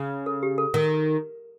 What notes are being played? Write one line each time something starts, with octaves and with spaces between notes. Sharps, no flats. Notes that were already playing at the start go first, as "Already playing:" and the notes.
Already playing: C#3
A4
G4
A4
D#3 A#4